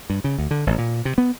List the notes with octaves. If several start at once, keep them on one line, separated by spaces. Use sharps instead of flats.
G2
C#3
D2
D3
A1
A#2
C3
B3